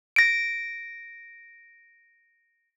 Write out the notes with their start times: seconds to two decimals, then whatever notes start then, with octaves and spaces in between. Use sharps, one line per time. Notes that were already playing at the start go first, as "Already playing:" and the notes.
0.16 A#6 D7